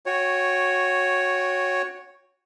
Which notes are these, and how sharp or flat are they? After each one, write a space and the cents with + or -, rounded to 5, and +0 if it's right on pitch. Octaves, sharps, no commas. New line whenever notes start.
F#4 -15 C#5 +0 G5 +15